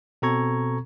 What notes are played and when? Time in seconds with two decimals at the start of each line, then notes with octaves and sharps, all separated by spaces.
0.22 B2 C4 A4 A#5 C#6 G#6